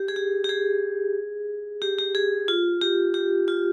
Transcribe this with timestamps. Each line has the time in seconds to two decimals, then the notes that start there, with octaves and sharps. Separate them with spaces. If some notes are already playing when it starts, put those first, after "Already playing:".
Already playing: G4
0.08 G#4
0.16 G4
0.44 G4
0.49 G#4
1.82 G4
1.99 G4
2.15 G#4
2.48 F4
2.82 G4
3.14 G4
3.48 F4